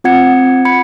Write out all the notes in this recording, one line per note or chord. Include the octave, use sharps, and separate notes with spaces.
C4 F4 F#5 G#6 C#7
B5 G#6 C#7